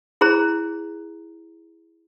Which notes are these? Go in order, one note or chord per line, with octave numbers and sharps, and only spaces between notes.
E4 G#4 C5 A#5